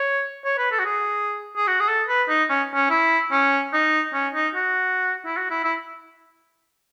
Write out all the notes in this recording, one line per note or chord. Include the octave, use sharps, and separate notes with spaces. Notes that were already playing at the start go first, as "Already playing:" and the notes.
Already playing: C#5
C#5
B4
A4
F#4
G#4
G#4
F#4
G#4
A4
B4
D#4
C#4
C#4
E4
C#4
D#4
C#4
D#4
F#4
E4
F#4
E4
E4